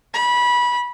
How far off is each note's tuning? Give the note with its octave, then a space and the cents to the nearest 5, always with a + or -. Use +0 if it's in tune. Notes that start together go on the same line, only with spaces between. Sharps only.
B5 -20